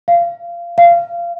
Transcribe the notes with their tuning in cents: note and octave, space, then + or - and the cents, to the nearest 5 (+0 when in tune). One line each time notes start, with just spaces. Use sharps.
F5 -20
F5 -20